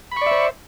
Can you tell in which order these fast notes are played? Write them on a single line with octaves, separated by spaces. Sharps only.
B5 C#6 D5 E5 C5